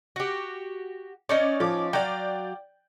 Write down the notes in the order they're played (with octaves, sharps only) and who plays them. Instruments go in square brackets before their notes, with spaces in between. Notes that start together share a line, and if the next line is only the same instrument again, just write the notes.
[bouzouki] F#4 G4
[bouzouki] C#4 D#4 C#5 [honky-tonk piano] D5
[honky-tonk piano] F3 D6
[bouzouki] F#3 F5 [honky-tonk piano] D5 G5